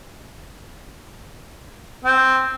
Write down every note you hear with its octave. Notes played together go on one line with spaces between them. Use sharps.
C4